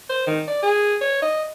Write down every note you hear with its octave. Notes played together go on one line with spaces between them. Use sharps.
C5
D#3
D5
G#4
C#5
D#5